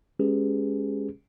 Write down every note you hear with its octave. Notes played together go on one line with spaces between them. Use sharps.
G#3 C#4 G4 G#4 B4